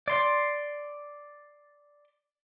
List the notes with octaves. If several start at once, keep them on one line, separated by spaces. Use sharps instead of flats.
D5 C6